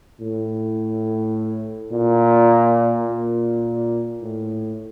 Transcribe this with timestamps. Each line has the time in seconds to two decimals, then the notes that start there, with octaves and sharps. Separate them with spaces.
0.20 A2
1.92 A#2
3.07 A#2
4.22 A2